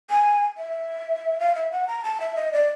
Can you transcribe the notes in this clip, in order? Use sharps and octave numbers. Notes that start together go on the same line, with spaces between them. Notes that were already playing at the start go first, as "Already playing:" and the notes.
G#5
E5
F5
E5
F#5
A#5
A5
E5
D#5
D5